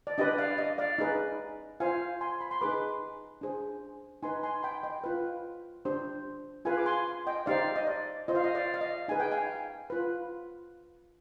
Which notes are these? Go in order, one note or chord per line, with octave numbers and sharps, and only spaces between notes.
D5
D4 G4 B4 D#5
D5 F5
D#5
D5 F5
D#4 G#4 B4
F4 C5 F5 G#5
G#5 C6
B5
C6
D#4 G#4 B4 B5 D6
D4 G#4 C5
D#4 B4 G#5 C6
G#5 C6
G5 B5
D#5 G5
F4 B4
D4 G4 C5
F4 G#4 B4 F5 G#5
D6
G#5 C6
D#5 G5
D#4 G4 C5 D5 F5
D#5
D5
F4 C5 D#5
F5
D#5
D5 F5
F5
D#5
D#4 G#4 B4 G#5
G5
F5 G#5
F4 B4